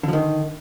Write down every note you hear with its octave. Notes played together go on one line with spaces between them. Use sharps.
D3 D#3 F3